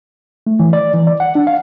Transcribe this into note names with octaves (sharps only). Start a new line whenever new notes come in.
A3
E3
D5
E3
D5
F#5
D4
F5